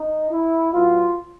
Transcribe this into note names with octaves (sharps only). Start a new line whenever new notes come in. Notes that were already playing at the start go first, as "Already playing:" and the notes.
Already playing: D#4
E4
A2 F#3 B3 F4